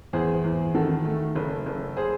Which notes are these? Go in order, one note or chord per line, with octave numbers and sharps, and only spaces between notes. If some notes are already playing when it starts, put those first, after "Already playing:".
E2 G#4 C5
E2
D#3 F#4 A4
A3
F#1
F#1
G#4 C5